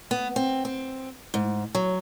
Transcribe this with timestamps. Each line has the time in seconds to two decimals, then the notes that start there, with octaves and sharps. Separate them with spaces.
0.11 B3
0.36 C4
0.65 C4
1.34 G#2
1.75 F#3